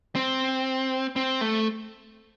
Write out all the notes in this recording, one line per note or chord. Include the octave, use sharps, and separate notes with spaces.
C4
C4
A3